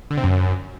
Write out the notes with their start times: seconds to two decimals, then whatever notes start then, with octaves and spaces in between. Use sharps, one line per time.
0.11 D3
0.17 C3
0.24 F#2